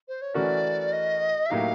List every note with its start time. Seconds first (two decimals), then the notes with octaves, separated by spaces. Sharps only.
0.08 C5
0.22 C#5
0.34 E3 A3 C#4 F#4 A#4 D5
0.93 D#5
1.46 E5
1.50 A2 F#3 A#3 D#4 G4 F5